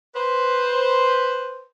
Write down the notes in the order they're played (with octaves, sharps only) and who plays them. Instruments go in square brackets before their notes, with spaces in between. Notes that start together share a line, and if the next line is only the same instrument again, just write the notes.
[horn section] B4 C5